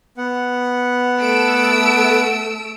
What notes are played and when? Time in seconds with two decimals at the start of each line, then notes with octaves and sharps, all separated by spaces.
0.17 B3 F#5
1.20 A3 E6 D7